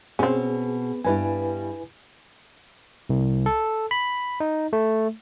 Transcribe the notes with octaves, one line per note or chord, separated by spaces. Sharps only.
B2 C4 C#4 G#4
G2 G3 E4 B4 G#5
C2
A4
B5
D#4
A3